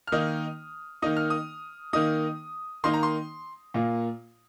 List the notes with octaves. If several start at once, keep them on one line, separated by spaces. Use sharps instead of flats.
F6
D#3 A#3 D#4 D#6
D#3 A#3 D#4 D#6
F6
D#6
D#3 A#3 D#4 D#6
D#3 A#3 D#4 C6
A#5
C6
A#2 A#3 F4